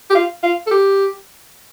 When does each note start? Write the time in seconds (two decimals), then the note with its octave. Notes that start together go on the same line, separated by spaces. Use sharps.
0.10 G4
0.15 F4
0.43 F4
0.67 A4
0.71 G4